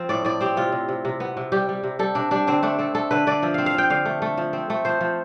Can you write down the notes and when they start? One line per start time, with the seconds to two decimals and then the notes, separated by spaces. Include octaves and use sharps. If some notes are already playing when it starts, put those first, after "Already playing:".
Already playing: F3 C4
0.09 A2 D5
0.25 A2 D5
0.41 C4 G4
0.57 C3 F4
0.72 C3
0.89 C3
1.05 C3
1.20 B3
1.37 C3
1.52 G3 G4
1.69 G3
1.83 C3
1.99 G3 A4
2.15 C3 D4
2.31 G3 D4
2.47 D3 C4
2.63 A3 D4
2.79 C4 A4
2.95 A3 A4
3.11 D3 B4
3.27 D3 D5
3.42 F3 E5
3.54 C4 F5
3.66 F5
3.74 F3 G5
3.90 D3 F5
4.05 A3
4.22 A3
4.37 F3
4.53 C4
4.70 A3
4.85 F3 C5
5.01 F3